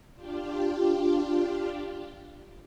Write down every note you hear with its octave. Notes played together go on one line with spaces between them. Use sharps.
D4 F4 G4